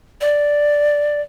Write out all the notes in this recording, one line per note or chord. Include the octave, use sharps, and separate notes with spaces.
D5